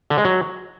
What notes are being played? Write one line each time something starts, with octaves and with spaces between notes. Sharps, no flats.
D3
G#3
F#3